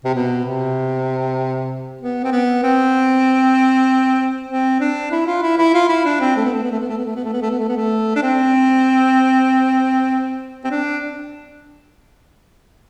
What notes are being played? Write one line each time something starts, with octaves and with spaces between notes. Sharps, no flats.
C3
B2
C3
B3
C4
B3
C4
C4
D4
E4
F4
E4
E4
F4
E4
D4
C4
A3
B3
A3
B3
A3
B3
A3
B3
A3
B3
A3
B3
A3
B3
A3
B3
A3
D4
C4
C4
D4